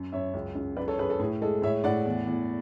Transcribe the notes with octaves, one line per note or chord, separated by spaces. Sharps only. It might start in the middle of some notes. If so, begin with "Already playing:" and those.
Already playing: F#2
F#2 C#5 E5
C#2
C#2
F#2 B4 D5
A4 C#5
F#2 G#4 B4
A4
A2 G#4
G#3 A4
A2 C#5 E5
A2 D5 F#5
E2
E2